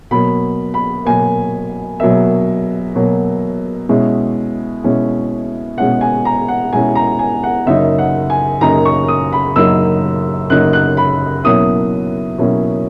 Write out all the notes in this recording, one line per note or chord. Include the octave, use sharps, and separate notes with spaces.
B2 F#3 A#3 B5
B5
B2 F#3 A#3 G#5
B2 F#3 A#3 E5
B2 F#3 A#3
B2 G#3 C#4 E4
B2 G#3 C#4 E4
B2 G#3 C#4 E4 F#5
G#5
A#5
F#5
B2 G#3 C#4 E4 G#5
A#5
G#5
F#5
F#2 C#3 F#3 A#3 D#4 E5
F#5
G#5
F#2 C#3 F#3 A#3 D#4 A#5
C#6
D#6
B5
F#2 C#3 F#3 A#3 D#4 E6
F#2 C#3 F#3 A#3 D#4 F#6
F#6
B5
B2 F#3 A#3 C#4 E4 D#6
B2 F#3 A#3 C#4 E4